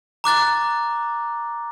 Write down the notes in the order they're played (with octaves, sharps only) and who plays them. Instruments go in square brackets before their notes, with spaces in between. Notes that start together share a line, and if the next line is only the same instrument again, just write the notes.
[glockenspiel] A#5 D6 F#6 A6